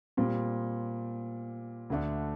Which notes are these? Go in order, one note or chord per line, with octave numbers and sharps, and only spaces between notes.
A#2 G3 C4
D2 D3 A3 D4